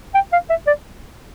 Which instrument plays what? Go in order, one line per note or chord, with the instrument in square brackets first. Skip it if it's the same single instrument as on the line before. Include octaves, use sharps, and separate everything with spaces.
[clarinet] G5
F5
E5
D5